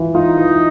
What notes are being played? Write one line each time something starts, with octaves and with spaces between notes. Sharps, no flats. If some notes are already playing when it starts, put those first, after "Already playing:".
Already playing: E3 F4
D#4 F4
E3